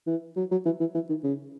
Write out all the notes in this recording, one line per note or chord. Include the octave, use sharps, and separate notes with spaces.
E3
F#3
F#3
E3
E3
E3
D#3
C#3